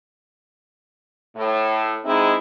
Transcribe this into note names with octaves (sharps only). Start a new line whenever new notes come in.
A2
G#3 C4 D#4 E4